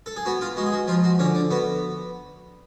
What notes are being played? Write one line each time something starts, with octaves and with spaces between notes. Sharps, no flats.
A4
G#4
B3 F#4
F4
G#3 F#4
G#4
F#4
F3 F4
F#4
D3 C#4
D4
B3 F#4